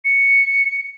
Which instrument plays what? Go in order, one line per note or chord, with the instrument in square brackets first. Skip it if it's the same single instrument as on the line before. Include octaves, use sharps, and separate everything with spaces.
[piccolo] C#7